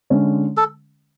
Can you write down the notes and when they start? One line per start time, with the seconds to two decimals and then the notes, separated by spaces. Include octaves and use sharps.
0.10 D3 G#3 C#4
0.57 A4